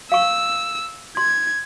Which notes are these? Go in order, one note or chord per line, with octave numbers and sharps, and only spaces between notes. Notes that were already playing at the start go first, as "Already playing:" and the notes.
F5 C#6 E6
C6 G#6